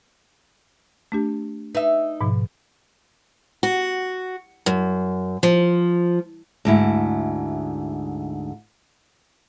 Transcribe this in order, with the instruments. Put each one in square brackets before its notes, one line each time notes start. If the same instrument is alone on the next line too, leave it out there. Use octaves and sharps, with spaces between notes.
[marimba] A3 D4 G4
[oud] D#4 E5 [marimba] B4
[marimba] G#2 B2 F3
[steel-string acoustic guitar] F#4
F#2
F3
[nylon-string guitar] D2 G#2 E4